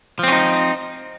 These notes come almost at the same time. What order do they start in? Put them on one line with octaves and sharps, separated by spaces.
F3 C4 C#4 D#4